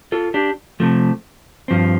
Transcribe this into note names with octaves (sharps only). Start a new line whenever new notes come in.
F4 A4
D4 G4
C3 F3 A3
G2 F3 C4